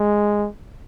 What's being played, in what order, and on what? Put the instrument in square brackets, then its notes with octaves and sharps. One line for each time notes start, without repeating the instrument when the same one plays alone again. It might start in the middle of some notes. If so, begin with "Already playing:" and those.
Already playing: [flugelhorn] G#3